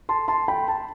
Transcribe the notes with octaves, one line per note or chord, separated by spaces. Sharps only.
A5 C6
A5 C6
G5 B5
A5